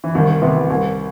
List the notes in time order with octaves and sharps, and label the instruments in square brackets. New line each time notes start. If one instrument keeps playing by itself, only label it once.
[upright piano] E3
[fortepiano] C2 [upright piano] D#3
[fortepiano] C3 E3 B3
C2